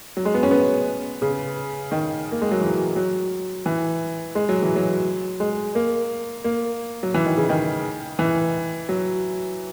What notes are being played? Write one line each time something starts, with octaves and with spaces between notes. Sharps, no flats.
F#3
G#3
B3
C#4
B3
C#3
D#3
A#3
G#3
F#3
E3
F#3
E3
G#3
F#3
E3
F#3
G#3
A#3
A#3
F#3
E3
D#3
C#3
D#3
E3
F#3